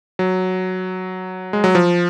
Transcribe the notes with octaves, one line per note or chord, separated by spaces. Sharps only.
F#3
G#3
F#3
F3